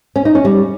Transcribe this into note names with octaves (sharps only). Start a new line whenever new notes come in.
C#4
D#4
C#4
G3